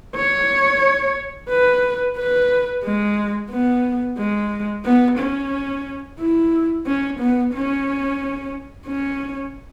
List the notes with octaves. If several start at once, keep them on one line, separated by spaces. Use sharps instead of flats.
C#5
B4
B4
G#3
B3
G#3
B3
C#4
E4
C#4
B3
C#4
C#4